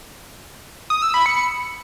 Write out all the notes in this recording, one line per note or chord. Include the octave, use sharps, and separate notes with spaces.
D#6
E6
B5
C#7